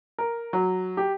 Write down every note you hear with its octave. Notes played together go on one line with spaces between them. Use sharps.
A#4
F#3
G4